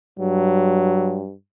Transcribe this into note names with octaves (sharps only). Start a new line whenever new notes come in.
G2 F#3